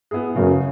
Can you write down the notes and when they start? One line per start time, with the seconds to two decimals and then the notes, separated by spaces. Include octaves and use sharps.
0.11 B3 E4 G#4
0.36 F#2 C#3